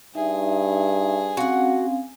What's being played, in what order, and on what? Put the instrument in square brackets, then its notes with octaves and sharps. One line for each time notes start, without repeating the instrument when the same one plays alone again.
[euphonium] G2 [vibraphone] D#4 E5 [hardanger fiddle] G#4
[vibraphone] C4 C#4 F5 [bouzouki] F#4 F#5